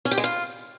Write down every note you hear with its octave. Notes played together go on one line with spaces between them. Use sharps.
C#4
G4
G#3
F4